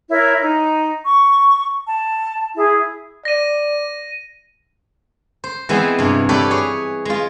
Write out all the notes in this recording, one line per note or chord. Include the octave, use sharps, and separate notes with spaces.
E4 A#4 C#5 E5
D#4
C#6
A5
E4 G#4
D5 A#6 D#7
C5
E3 G#3 B3 C4 C5
G2 C3
G4 A4 B4 C#5 D5
G#4 C#5
G#3 F4